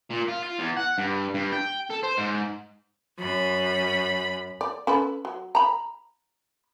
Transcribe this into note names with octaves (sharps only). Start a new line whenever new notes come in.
A#2
F4
F4
E2
F#5
G2
G2
G5
A4
C5
G#2
F#2 B5
D5
C#4 A4 B4
F#3
A#5 B5